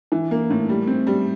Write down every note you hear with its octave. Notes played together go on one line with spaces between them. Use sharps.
E3
A#3
A2
G3
C4
G3